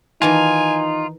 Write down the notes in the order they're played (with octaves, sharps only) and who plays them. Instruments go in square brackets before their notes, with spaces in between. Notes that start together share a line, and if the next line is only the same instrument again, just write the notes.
[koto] D#3 E3 A5 [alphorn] D#4 [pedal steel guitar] F4 [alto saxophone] G#5